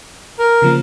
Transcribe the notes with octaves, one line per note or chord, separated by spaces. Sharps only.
A#4
C#3 F3 A#3